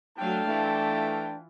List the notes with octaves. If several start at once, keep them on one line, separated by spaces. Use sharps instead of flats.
F#3 A3 D4 F5 G5 A5
E3 A3 F4